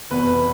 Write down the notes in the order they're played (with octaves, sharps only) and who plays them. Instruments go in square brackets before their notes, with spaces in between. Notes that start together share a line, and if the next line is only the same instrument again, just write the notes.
[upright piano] F1 E2 B2 B4